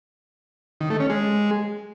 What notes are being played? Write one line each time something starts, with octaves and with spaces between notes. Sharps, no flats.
D#3
A3
C#4
G#3